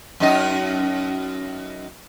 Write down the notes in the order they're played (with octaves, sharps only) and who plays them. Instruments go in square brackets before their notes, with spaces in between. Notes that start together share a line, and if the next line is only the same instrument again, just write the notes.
[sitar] F#2 D#4 D#5